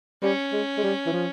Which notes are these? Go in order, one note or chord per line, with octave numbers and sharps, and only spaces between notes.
G3 C#4
G#3
G#3
G3
E3
F3